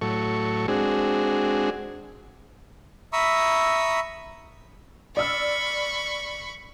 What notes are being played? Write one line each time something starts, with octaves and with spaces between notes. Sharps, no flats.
A2 F#3 A4 C#6
G#3 C4 D4 F#4 G#4
E5 A#5 B5 C#6 D#6 E6
D5 B5 C#6 E6 F6